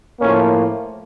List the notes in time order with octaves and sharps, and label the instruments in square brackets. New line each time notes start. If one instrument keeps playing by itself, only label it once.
[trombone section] A2 F3 A#3 C#4